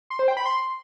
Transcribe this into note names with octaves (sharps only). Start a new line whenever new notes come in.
C6
C5
G5
B5
C6